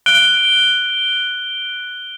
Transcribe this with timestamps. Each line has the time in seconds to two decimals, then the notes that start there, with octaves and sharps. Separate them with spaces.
0.06 F#6 D7 G7